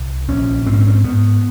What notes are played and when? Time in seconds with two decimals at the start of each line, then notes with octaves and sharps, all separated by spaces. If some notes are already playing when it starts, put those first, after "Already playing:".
Already playing: C2
0.28 A#1 C#4
0.66 G#2 C4
0.73 C#4
0.81 C4
0.87 C#4
0.95 C4
1.04 G#2 B3